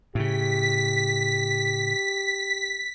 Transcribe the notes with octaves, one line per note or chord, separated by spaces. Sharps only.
A2 C#3 G4 B6